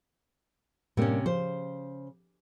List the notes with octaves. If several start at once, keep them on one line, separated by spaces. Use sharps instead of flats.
A2 C3 G3 A#3 C#4 D4
C#3 F3 C5